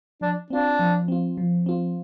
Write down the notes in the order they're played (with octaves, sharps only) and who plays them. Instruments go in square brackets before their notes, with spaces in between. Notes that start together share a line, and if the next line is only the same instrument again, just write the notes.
[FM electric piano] F3 [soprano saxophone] D4
[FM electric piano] C4 F4 [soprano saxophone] D4
[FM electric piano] F3
C4 F4
F3
C4 F4